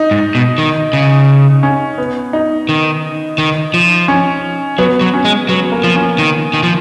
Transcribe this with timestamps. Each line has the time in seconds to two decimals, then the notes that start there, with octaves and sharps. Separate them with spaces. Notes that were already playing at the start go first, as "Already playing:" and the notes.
Already playing: D#4
0.11 G#2
0.35 B2
0.58 D#3
0.93 C#3
1.63 C#4
1.98 B3
2.33 D#4
2.69 D#3
3.38 D#3
3.74 F3
4.08 C#4
4.78 F#3 B3
5.01 F#3
5.14 C#4
5.25 G#3
5.48 F#3 B3
5.72 A#3
5.84 F3
5.96 C#4
6.19 D#3
6.54 D#3
6.63 F3